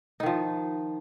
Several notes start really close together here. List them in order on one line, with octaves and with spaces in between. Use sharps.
D#4 D#3 F3